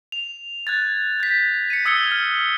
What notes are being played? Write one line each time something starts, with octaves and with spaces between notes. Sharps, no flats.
F7
F#6 G#6 A6
G6 B6
C#7 D#7
D#6 E6 G#6 C#7 G7
F6